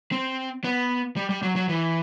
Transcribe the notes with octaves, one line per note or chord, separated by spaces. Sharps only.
C4
B3
G3
G3
F#3
F#3
E3